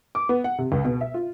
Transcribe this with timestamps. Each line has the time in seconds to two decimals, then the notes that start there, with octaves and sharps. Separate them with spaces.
0.15 D6
0.29 B3
0.44 F#5
0.58 C3
0.72 C#2
0.84 B2
1.01 E5
1.14 F4